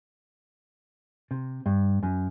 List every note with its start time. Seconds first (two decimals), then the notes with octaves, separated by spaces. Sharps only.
1.31 C3
1.66 G2
2.03 F#2